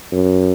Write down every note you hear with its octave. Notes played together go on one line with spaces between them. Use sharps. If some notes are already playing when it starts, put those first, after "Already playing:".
F#2